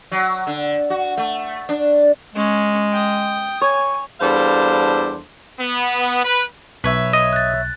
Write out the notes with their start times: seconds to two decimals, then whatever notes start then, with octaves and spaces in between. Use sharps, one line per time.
0.11 F#3
0.47 D3
0.90 F#4
1.17 A3
1.69 D4
2.35 G#3 C#4
2.92 G5 D#6
3.61 C#5 G#5
4.20 E2 G3 D4 A4 C5 F5
5.59 B3
6.23 B4
6.84 B1 B4 C#5 E5
7.13 D#5
7.33 F#6 A6